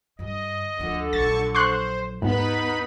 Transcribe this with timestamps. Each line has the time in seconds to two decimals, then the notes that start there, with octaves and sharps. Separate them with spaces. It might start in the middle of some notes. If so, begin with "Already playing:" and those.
0.19 G2 D3 D#5
0.80 D2 D3 F3 A4
1.13 A#1 F#3 A5 C#6 A6
1.55 C5 C6 C#6 F#6
2.22 D#2 G#2 B3 D#4 B4 B5